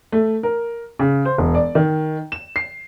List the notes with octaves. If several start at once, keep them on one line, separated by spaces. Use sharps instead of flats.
A3
A#4
C#3
C5
E1
D5
D#3
E7
C7